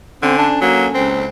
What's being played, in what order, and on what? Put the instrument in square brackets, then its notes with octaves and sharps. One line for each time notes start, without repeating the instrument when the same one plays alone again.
[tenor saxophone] D3 [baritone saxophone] C4 [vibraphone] C#4 A4 G#5
[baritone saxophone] D4
[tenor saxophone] F#3 [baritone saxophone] A#3
[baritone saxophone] C#2 [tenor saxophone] C4